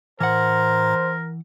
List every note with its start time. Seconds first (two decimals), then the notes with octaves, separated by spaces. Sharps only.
0.20 A2 E3 A#4 C5 F#5 A#5